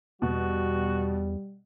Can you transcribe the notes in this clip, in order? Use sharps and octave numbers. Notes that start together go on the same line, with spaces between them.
E2 B2 G3 F#4